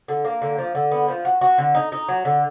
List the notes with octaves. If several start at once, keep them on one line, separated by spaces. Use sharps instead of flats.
D3
A#3
D3
F3
D3
B3
F3
F#4
F#4
D3
D#4
D#4
F#3
D3